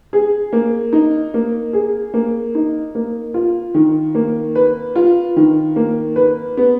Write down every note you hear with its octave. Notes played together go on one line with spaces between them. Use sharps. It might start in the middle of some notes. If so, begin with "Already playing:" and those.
G#4
A#3
D#4
A#3
G#4
A#3
D#4
A#3
F4
D#3
A#3
B4
F4
D#3
A#3
B4
B3